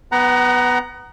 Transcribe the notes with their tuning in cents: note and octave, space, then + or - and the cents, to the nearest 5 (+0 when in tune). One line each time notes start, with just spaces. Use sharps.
B3 +0 F#5 +30 A#5 +10